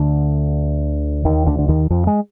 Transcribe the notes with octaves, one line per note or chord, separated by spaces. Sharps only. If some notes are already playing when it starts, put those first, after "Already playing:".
Already playing: D2 D3
D#2 D#3
D2 D3
D3
D#2 D#3
F2 F3
G#3